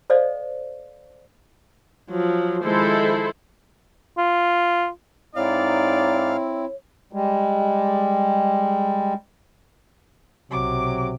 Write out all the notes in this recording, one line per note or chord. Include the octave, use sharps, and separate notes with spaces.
A4 C5 D5 D#5 F5
F3 F#3
D#3 F3 G#3 E4 A4 C5
F4
G#2 C4 D#4 E4 C#5 D5 F5
G3 G#3
B1 C3 F#3 D6